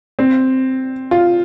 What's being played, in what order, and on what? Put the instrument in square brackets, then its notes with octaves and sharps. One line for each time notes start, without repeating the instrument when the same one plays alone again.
[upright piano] C4
F4